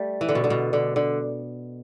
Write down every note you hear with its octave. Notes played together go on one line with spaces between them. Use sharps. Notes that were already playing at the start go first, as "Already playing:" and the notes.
Already playing: G3 A3
E3
D3
B2
D3
B2
D3
D3